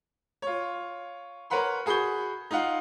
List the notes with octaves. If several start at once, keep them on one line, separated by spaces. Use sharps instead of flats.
F4 C#5
A#4 B4 C#5 F#5 B5 C6
F#4 G#4 B5 C#6 G6 G7
D#4 F4 F5 F#5